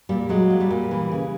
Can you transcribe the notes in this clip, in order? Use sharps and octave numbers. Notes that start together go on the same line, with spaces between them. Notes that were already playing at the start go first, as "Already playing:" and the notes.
A#2 G3
F#3 G#3
A#2
G3
A#2
E3
C#3